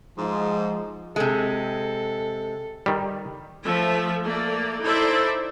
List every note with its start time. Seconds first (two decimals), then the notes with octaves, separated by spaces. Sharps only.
0.18 G#2 F3
1.16 C3 G#3 A4
2.86 D#3 G3
3.64 F3 A3 E5
4.23 A3 A#3 D5
4.81 D#4 E4 A4 C5 D5 E5